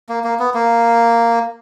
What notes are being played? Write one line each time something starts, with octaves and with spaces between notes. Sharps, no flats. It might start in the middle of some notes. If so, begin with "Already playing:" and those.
A#3
A#3
B3
A#3